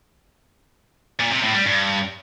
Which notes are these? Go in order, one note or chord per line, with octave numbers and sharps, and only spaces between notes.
A#2
C3
A2
G3
G2